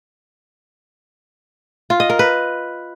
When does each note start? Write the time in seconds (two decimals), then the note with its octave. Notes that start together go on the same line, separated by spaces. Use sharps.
1.90 F4
2.00 D#5
2.10 A#4
2.19 B4